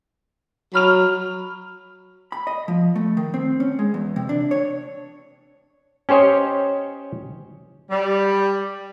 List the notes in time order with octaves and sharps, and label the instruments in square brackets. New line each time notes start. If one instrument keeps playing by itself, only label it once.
[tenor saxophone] F#3 [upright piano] B5 F6 F7
[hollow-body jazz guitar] B5
D#5
F3
A3
D#3
C4
C#4
G#3
E2
C3
D4
C#5
[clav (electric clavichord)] C#4 G4 C5 C#5 D#5
[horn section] G3